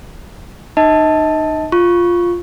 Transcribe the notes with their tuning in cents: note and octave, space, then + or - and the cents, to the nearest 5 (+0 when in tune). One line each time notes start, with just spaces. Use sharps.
D#4 -30 D#5 +35 A5 +0
F4 +0 C#6 +0